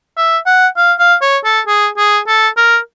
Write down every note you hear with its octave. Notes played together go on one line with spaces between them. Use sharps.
E5
F#5
F5
F5
C#5
A4
G#4
G#4
A4
A#4